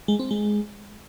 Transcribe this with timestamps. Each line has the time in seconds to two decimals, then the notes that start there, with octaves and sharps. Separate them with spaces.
0.08 G#3
0.19 C4
0.31 G#3